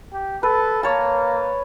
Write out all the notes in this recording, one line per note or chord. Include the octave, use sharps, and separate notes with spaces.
G4
A4 B4
A#3 C#5 A5